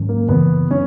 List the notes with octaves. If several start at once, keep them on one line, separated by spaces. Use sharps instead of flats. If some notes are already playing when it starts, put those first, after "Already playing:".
Already playing: G#2 D#3 F#3 C#4
A#3
F#2 C#3 E3 B3
F#3 C#4